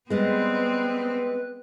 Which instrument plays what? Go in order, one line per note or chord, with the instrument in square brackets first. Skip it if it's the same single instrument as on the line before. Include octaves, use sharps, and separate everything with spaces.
[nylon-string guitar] G3 G#3 [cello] B3 C4 [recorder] B4